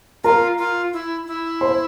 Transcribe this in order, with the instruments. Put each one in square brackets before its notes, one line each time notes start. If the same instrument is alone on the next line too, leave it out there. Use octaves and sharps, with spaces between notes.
[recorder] F4 [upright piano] A#4 A#5
[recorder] F4
E4
E4
[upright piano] C5 C6